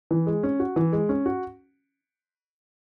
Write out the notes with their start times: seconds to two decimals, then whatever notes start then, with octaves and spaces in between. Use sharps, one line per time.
0.11 E3
0.27 G#3
0.43 C#4
0.60 F#4
0.76 E3
0.93 G#3
1.09 C#4
1.26 F#4